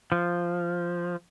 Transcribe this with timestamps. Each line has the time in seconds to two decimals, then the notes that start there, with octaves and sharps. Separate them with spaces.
0.12 F3